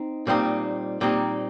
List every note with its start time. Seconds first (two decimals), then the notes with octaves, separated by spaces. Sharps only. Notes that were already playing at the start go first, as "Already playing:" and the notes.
Already playing: C4 D#4
0.27 A#2 G3 C4 D#4
1.01 A#2 G3 C4 D#4